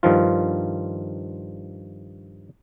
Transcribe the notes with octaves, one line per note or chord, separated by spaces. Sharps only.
G2 D#3 F3 F4